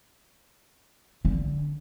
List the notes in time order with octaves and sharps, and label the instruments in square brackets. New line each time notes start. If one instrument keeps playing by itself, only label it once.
[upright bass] D3